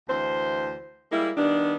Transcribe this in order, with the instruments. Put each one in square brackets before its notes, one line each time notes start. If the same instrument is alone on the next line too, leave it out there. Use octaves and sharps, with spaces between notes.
[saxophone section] D2 E3 C5
G3 G#3 A#3 E4
D#3 G3 B3 D4